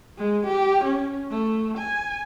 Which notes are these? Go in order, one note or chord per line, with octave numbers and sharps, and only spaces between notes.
G#3
G4
C#4
A3
G#5